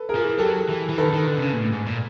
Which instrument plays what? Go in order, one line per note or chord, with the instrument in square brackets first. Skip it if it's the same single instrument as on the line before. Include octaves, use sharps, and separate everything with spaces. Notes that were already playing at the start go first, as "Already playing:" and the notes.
Already playing: [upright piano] A4 B4
G#4 A#4
[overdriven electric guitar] F3
E3
[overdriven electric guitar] F#3 [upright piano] G4 A4
[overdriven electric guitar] E3
E3
[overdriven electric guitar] D#3 [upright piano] A4 B4
[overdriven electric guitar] D3
D#3
D3
C3
C#3
A#2
A2
G#2
A#2